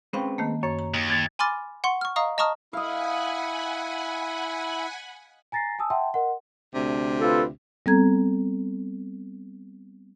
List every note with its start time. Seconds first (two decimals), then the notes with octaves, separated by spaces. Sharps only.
0.13 G#3 C4 C#4 B4 F5 G5
0.38 D#3 A3 A#3
0.63 F#2 C#5
0.79 A#5
0.94 D#2
1.10 G#6 A6
1.39 G#5 B5 C6 D6 F6 A6
1.84 F#5 C6 C#6
2.01 C#6 F6
2.16 D#5 F5 A#5 C#6 D#6
2.38 D#5 A5 A#5 C#6 D#6 F6
2.73 E4 D#5 F5 F#5 G#5 B5
5.52 G#5 A#5 A6 A#6 C7
5.79 G#5 A5 D#6 E6
5.90 E5 F#5 G5 A5 C6
6.13 A#4 D#5 F#5 C6
6.74 D2 C3 D4
7.21 F4 A4 B4
7.86 G3 B3 C4 A4 A#5 G#6